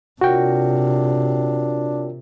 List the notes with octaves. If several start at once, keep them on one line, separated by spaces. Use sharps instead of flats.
C3 D4 F4 F#4 A#4 C#5 G5